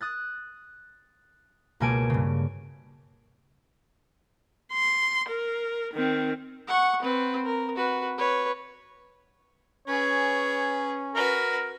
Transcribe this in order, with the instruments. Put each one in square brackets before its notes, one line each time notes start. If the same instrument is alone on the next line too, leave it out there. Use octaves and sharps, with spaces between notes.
[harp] D#6 F#6 A6
C#2 B2 A#3 G#5 A5 D7
G2 C#3
[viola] C6
A#4
D#3 C4
[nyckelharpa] F#5 C#6
C4 B4
A#4
F#4 B4
B4 C#5
[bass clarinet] C#4 [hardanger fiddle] G#4 B4 [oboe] C#5
[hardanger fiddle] F#4 B4 [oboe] A#4